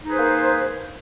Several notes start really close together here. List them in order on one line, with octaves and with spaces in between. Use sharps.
D#4 G#4 B4 C5 A#3